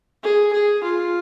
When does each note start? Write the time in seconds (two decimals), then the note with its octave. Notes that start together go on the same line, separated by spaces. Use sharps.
0.23 G#4
0.53 G#4
0.84 F4